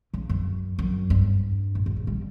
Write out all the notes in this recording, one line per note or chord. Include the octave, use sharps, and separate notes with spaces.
C#3
F#2
F#2
G2
A2
B2
C#3
G3